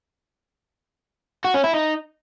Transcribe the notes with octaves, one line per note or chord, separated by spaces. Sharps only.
F#4
C#4
E4
D#4